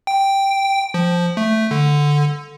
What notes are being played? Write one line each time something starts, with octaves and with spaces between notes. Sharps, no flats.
G5
F3
A3
D3